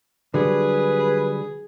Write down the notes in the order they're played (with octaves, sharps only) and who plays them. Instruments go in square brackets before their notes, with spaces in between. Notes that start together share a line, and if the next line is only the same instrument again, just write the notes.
[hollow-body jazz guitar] D3 F#3 G3 [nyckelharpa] G#4 [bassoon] B4